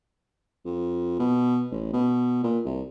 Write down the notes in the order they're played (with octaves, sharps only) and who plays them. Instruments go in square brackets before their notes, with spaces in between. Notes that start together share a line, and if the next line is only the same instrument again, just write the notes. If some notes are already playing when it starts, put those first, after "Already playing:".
[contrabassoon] F2
B2
A1
B2
A#2
C2